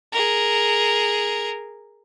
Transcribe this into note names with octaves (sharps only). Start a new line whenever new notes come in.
G#4 A#4